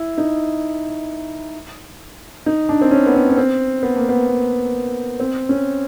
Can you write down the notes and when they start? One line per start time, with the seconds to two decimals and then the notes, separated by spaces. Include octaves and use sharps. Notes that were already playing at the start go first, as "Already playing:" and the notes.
Already playing: E4
0.18 D#4
2.46 D#4
2.69 D4
2.81 C4
2.91 C#4
3.07 B3
3.14 C4
3.29 C#4
3.37 C4
3.83 B3
3.96 A#3
4.09 B3
4.28 A#3
5.20 C4
5.49 C#4